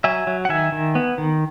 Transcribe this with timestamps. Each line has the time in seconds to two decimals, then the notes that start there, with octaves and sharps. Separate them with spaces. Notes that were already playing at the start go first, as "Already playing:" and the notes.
0.04 F#3 E5 G#5
0.27 F#3
0.45 F#5
0.49 D#3 E5 G#5
0.72 D#3
0.95 B3
1.18 D#3